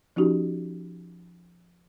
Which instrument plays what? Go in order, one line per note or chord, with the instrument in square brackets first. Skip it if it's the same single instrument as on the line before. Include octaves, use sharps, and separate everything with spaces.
[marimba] F3 C#4 D#4 F#4 G4